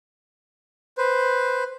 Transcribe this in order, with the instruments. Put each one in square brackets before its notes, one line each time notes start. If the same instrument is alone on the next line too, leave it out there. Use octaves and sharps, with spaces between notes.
[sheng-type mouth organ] B4 C5